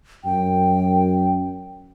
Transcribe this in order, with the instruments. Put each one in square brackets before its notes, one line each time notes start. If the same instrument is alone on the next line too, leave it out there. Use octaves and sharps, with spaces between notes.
[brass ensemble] F#2 [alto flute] G5